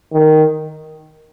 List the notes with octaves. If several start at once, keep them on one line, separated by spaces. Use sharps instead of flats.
D#3